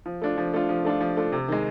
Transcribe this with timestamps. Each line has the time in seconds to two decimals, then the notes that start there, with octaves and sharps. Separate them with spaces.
0.06 F3
0.22 A3 D4 F4
0.38 F3
0.53 A3 D4 F4
0.69 F3
0.85 A3 D4 F4
1.01 F3
1.17 A3 D4 F4
1.32 C3
1.48 D#3 G#3